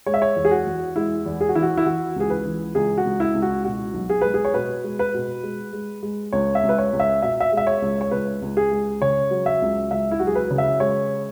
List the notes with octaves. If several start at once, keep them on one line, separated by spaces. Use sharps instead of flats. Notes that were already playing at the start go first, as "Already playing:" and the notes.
G#3 C#5
E5
C#5
E2
G#4
F#4
E2
G#3 E4
E2
G#4
F#4
E3 E4
F#4
E4
E3 F#4
C#2 G#4
B4
E3
C#2 G#4
F#4
C#2
E4
C#2
F#4
B2 F#4
B1
G#4
G#3 B4
G#4
C#5
B2 B4
G#3
B4
B2
G#3
G#3
G#3
C#2 C#5
E5
C#2
B4
C#5
C#2
E5
B2 E5
E5
G#3
E5
C#5
C#2
C#5
C#2 B4
C#2
G#4
G#3
C#3 C#5
F#3
E5
C#2
C#2 E5
E4
F#3 F#4
G#4
B4
C#3
E5
G#3 C#5